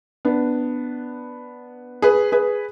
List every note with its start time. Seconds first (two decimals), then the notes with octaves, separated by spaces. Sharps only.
0.25 B3 D4
2.02 G#4 B4
2.32 G#4 B4